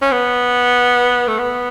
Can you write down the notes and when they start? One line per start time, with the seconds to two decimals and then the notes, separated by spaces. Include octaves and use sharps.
0.02 C#4
0.12 B3
1.28 A3
1.39 B3